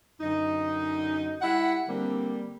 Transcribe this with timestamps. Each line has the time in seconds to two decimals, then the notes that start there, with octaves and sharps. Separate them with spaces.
0.21 F#2 D3 D#4
1.42 G3 E4 F#5
1.88 D3 G3 A#3 C4